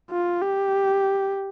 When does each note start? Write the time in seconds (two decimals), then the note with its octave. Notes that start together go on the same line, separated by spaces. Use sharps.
0.11 F4
0.42 G4